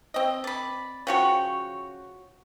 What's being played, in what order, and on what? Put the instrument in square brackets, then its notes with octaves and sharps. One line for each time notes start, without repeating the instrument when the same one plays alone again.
[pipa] C4 D#5
[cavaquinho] D5 B5
[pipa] C#3 F3 [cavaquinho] F#4 C#5 G5